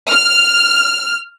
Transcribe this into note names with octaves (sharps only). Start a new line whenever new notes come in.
F6